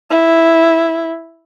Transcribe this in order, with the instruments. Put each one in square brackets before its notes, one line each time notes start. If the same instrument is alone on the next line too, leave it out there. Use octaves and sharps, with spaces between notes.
[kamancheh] E4